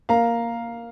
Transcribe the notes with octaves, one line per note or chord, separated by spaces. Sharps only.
A#3 F5 A#5